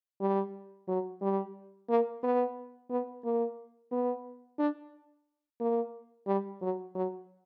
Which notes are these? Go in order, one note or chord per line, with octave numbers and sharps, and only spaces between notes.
G3
F#3
G3
A#3
B3
B3
A#3
B3
D4
A#3
G3
F#3
F#3